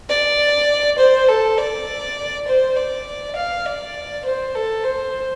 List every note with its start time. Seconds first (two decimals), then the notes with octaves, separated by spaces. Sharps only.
0.09 D5
0.98 C5
1.28 A4
1.58 D5
2.48 C5
2.77 D5
3.36 F5
3.66 D5
4.25 C5
4.55 A4
4.85 C5